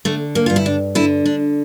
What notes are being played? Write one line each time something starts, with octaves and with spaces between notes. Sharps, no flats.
D3 A3
A#3
G2 F4
E4
D4
D3 E4
D4